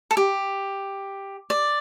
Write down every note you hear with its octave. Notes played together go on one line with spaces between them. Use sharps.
A4
G4
D5